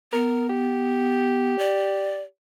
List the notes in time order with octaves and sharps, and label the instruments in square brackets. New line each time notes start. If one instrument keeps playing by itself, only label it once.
[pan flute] B3 [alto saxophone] A#4
[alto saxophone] G4
[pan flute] D5